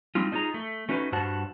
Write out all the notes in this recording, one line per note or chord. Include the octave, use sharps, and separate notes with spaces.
G3 C4 D#4 F4
D4 D#4 F4 G#4 A#5
A3
A3 C#4 D#4 F#4 A#4 B4
G2 G3 F#4 C5 F#5 A5